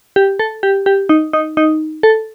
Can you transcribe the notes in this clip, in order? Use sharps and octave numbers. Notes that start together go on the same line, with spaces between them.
G4
A4
G4
G4
D#4
D#4
D#4
A4